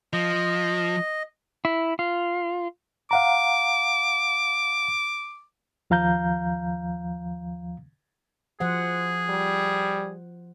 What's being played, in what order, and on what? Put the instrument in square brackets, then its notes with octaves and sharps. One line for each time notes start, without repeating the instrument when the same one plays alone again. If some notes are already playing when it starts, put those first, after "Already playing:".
[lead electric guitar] F3 [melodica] D#5
[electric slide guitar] E4
F4
[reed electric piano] F5 F#5 A#5 [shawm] D6
[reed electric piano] D#2 F3 F5 A#5 G6
[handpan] F3 C5 F#5 [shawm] G#4
[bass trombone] G3